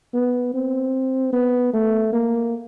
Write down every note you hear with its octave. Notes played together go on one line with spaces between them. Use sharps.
B3
C4
B3
A3
A#3